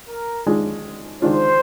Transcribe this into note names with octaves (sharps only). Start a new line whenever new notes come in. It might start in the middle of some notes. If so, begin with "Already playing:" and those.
A#4
D#3 G#3 D4 F4
D#3 G#3 D4 F4 C5